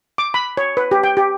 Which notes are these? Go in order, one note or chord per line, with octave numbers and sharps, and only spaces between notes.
D6
B5
C#5
B4
G4
G5
G4